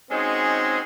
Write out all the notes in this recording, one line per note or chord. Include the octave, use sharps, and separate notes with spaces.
G#3 C4 C#4 D#4 F#4 G#4